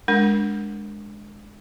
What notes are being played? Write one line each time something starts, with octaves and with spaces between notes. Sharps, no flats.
G#3 D4 A#4